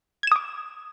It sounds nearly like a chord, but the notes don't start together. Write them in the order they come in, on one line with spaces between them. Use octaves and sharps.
G#6 E7 D#6 D6